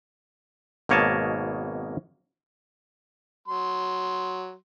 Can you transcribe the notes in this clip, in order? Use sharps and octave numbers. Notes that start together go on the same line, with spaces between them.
G#1 B2 A#3 C#5 D#5 A5
F#3 C6